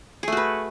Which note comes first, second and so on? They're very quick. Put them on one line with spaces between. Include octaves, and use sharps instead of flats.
G#4 A3 F#4 B4